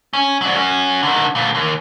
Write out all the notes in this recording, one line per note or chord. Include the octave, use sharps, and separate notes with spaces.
C#4
F#3 D5
F#3 C#4
D3 D#3
D2 A#2
D#2